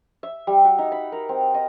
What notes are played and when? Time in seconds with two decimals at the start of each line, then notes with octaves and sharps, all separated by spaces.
0.23 E5
0.47 G3
0.65 F#4
0.78 D#4
0.92 B5
1.12 A#4
1.29 C4
1.54 D#5